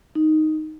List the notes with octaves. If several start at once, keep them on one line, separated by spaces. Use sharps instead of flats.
D#4